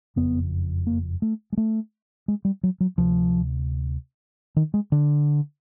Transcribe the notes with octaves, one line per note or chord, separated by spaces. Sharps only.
F#1 F2 C#3 B3
A#3
A3
G#3
A3
G#3
G3
F#3
F#3
D2 C3 F3
D#3
G#3
D3